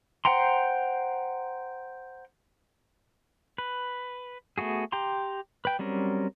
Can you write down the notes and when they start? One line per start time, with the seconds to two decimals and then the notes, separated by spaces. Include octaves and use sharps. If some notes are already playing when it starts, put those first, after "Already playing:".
0.25 C5 F#5 G5 A#5 C6
3.58 B4
4.58 A3 B3 F#4 G#4
4.92 G4 G5 A#5 C6
5.65 B4 G5
5.79 F#3 G3 C4 C#4 A#4